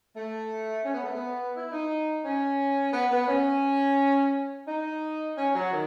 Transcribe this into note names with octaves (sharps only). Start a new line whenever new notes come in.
A3
C#4
B3
A3
B3
E4
D#4
C#4
B3
B3
C#4
D#4
C#4
F#3
D#3